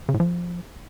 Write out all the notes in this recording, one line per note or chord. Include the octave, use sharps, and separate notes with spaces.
C#3
A2
F3